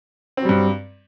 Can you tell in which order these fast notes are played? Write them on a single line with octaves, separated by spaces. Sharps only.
C4 F#3 G3 G2